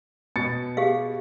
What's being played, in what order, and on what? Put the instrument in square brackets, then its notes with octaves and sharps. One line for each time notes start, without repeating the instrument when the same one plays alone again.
[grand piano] B2 A6 C#7
[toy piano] G4 G#4 F5